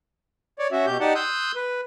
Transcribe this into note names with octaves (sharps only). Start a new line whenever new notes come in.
C#5 D5
C#4 F#4 E5
B2 G4 G6
D#4 G4 D5 F#5 A5
C6 D#6 E6 F#6 G6
B4